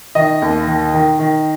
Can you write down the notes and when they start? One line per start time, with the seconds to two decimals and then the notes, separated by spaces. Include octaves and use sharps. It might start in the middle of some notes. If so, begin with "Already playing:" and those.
0.15 D#3 D#5
0.42 D#2
0.67 D#3
0.94 D#3
1.19 D#3